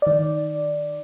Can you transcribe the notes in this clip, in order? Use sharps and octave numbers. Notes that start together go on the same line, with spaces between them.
D#3 D5